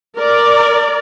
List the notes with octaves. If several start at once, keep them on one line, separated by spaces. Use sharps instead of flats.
A#4 D5